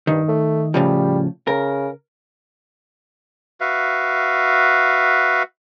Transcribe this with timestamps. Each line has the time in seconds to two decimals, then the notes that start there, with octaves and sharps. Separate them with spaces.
0.07 G2 D#3
0.28 A3
0.74 A2 C#3 F3 G3
1.47 C#3 A#4
3.61 F#4 B4 E5 F5